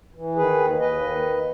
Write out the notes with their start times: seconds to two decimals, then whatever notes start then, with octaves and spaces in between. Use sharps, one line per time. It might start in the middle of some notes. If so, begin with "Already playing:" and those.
0.15 E3
0.36 D#3 G#4 B4
0.58 D#2
0.79 D#2 B4 D#5
1.01 D#3
1.22 D#2